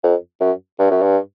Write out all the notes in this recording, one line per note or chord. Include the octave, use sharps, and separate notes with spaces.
F2
F#2
G2
F#2
G2